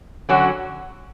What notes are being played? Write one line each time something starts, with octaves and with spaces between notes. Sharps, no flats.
D3 F#3 C#4 F#4